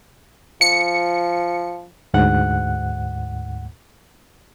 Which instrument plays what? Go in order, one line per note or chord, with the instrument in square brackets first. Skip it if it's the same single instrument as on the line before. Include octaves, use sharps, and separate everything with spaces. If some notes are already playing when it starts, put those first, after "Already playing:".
[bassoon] F3 [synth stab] C#7
[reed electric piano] D2 G#2 F#5 F#6